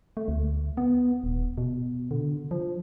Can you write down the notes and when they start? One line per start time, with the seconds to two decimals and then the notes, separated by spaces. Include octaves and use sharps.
0.17 A3
0.28 D2
0.77 B3
1.24 D#1
1.58 B2
2.11 D3
2.51 F3